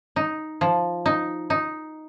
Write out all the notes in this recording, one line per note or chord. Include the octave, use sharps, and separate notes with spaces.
D#4
F3
D#4
D#4